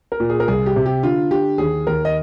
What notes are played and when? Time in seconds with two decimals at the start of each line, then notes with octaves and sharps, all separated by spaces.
0.12 A#4
0.20 A#2
0.30 G#4
0.40 A#4
0.48 C2 G#4
0.66 G4
0.76 C3
0.86 G4
1.03 D3 F4
1.31 D3 G4
1.58 D#2 G#4
1.87 D#2 A#4
2.05 D#5